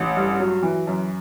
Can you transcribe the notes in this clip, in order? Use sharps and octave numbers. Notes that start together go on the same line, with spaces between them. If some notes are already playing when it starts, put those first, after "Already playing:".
Already playing: A1
G2
F#3
E3
F#2